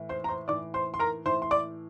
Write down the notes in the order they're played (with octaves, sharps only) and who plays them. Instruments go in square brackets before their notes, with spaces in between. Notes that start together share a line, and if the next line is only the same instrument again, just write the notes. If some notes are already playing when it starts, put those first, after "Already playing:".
Already playing: [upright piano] A2 E3
C5 C6
A#5
C5 C6
E3 D5 D6
A2
C5 C6
C6
A#4 A#5
A2 E3 C5 C6
C6
D5 D6